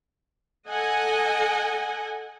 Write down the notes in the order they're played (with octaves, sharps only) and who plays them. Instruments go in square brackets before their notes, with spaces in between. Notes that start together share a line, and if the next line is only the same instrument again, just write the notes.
[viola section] A4 D#5 F#5 G#5